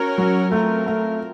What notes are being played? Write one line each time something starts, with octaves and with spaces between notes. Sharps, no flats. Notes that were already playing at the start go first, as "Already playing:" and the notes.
Already playing: C#4 F#4 A#4 C#5
F#3
F#3 A3 C4 F4 A#4
A3